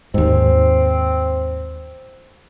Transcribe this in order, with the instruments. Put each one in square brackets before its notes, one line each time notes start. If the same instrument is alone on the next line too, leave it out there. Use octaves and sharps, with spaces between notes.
[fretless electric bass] D#2 G#2 [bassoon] C4